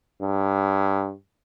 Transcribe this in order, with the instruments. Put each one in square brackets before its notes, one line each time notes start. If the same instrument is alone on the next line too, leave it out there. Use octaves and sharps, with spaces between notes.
[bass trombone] G2